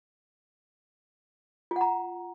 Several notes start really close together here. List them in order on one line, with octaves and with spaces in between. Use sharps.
F4 F#5 A#5